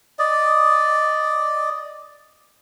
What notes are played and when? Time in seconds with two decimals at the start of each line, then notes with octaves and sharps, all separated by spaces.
0.19 D5 D#5